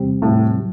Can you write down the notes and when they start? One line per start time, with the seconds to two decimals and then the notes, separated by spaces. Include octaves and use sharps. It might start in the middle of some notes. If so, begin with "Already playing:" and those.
Already playing: E2 C3 G3 C4 G4
0.22 A2
0.57 F#3